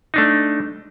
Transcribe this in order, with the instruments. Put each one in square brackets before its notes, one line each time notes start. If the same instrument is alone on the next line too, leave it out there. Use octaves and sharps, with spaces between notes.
[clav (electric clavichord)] A3 D4 D#4